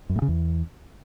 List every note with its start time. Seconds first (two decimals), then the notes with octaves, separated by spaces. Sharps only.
0.09 F#2
0.16 A2
0.22 C#3
0.28 E2